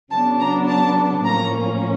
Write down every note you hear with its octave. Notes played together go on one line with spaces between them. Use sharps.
C#3 F#3 B3 D4 A5
A#5
A5
A2 F3 A#3 C#4 A#5